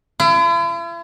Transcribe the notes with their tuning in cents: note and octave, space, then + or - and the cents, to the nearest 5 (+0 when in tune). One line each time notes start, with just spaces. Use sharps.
E4 +45